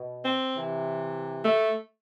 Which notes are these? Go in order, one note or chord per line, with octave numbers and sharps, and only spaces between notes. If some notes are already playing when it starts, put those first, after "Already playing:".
Already playing: B2
C4
C3 E3
A3